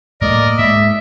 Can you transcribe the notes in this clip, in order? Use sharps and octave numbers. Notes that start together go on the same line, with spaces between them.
A2 A3 A#3 A#4 D5 D#5
G#2 E5